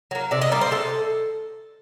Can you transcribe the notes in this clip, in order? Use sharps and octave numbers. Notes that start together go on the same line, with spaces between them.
F#3 A#3
C3 D5
D#5
G3 A#3 D5
C5
C3 A4